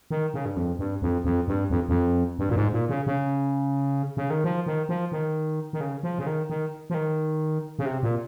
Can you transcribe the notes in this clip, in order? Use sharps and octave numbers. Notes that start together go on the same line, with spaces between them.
D#3
C#3
G2
F2
G2
F2
F2
G2
F2
F2
G2
A#2
G#2
A#2
C#3
C#3
C#3
D#3
F3
D#3
F3
D#3
D#3
C#3
F3
C#3
D#3
D#3
F3
D#3
C#3
C3
A#2